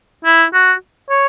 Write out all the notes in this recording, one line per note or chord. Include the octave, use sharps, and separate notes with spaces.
E4
F#4
C#5